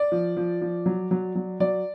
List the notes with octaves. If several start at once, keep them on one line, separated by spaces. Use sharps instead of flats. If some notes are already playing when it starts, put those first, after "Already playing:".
Already playing: D5
F3
F3
F3
F#3
F#3
F#3
F#3 D5